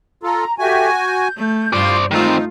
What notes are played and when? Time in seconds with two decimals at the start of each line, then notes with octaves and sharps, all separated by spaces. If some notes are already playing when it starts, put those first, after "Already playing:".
0.23 F4 A4 A#5
0.58 F#4 G4 A4 E5 G#5
0.97 G6
1.37 A3
1.73 G2 F4 C5 D5 C6
2.11 D#3 A3 C4 D#4 F4